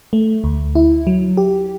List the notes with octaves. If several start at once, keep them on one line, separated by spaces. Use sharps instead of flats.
A3
D2
E4
F#3
G4